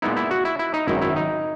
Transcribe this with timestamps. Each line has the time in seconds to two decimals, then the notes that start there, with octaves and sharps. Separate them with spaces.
0.02 A#2 G#3 B3 D#4 E4
0.17 E4
0.31 F#4
0.45 E4
0.59 E4
0.74 D#4
0.88 G#1 F#2 D#3 E4
1.01 E4
1.16 D#4